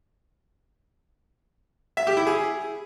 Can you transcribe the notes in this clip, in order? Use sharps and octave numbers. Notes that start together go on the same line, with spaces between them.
E5
G4
E4
G#4